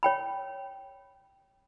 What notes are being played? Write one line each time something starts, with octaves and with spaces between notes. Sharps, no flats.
C#5 G5 B5